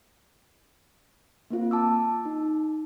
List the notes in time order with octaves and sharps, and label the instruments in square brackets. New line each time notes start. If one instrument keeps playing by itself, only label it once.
[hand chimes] A#3 C4 F4
A5 D6 E6
D#4